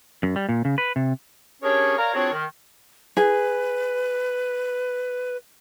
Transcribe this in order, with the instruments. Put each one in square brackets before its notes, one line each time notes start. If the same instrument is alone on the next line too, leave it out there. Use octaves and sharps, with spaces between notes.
[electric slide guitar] F#2
G3
A#2
C#3
B4
C3
[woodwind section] C#4 D4 G4 G#4 A#4 C#5
A#4 C#5 D5 F5 A#5
C4 D4 F4 F#4 G#4 C#5
D#3
[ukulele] G#4 [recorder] B4